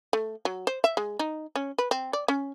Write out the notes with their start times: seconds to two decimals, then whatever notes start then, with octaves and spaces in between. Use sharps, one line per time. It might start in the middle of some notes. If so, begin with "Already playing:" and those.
0.13 A3
0.45 F#3
0.67 C5
0.84 E5
0.97 G#3
1.19 D#4
1.56 C#4
1.78 B4
1.91 C4
2.13 D5
2.28 C#4